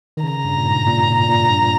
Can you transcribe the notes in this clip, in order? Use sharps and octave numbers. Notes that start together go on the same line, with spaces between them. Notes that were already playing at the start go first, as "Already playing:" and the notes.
D#3
C#3 A#5
G2
A#2
G#2
A#2
A#2
A#2
G2
A#2